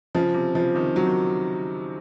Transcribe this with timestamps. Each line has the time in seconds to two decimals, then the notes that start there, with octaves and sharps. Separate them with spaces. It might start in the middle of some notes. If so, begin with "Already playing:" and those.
0.15 C#3 F3
0.34 C3
0.55 C#3 F3
0.75 C3 D#3
0.96 F#3
1.06 D#3